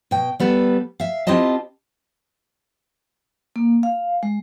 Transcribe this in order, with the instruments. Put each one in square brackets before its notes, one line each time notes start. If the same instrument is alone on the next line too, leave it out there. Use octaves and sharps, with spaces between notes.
[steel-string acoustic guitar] B2 G5
G3 B3 A4 B4
E5 F5
C4 E4 F4 G4 D#5 A5
[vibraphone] A#3
F5
G#3